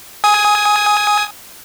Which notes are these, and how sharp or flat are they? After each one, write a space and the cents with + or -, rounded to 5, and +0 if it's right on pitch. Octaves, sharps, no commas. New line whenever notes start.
G#5 +0 D#6 +20